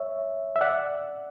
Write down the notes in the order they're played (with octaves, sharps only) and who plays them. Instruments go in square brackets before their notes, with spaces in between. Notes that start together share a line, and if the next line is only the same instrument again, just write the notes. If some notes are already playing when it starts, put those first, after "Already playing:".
Already playing: [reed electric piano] C#5 E5
E5
D5 F#5